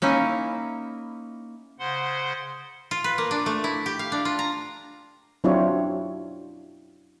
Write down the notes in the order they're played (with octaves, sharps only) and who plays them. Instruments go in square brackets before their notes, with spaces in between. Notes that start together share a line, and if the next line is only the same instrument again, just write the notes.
[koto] A#3 C#4 D#4 E4
[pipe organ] C#3 C5 F#5 C6
[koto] F4
B4
A#3
D4
A3
E4
G4
F5
D4
F4
A#5
[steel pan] F#3 C4 D4 E4 F4 C#5